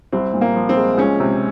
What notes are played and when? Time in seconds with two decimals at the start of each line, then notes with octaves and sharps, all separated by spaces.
0.12 C2 C4
0.34 A#2
0.41 A#3
0.56 F3
0.69 C4
0.76 G#3
0.98 C#2 C#4
1.20 C3